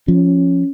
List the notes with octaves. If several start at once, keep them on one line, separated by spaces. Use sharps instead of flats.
F3 C#4